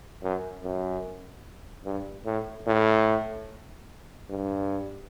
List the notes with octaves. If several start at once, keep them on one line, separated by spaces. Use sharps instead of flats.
F#2
F#2
G2
A2
A2
G2